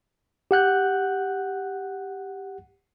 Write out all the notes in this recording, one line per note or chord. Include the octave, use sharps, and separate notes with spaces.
G4 F#5 F#6 G6